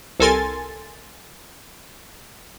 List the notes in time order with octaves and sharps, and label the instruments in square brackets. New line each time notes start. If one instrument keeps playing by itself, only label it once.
[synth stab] C2 A4 A#4 G#5 C6 A6